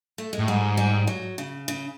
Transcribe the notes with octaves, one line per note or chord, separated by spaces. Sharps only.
A3
G#3
A2
G#2 G3
G3
F#3
C#3
C#3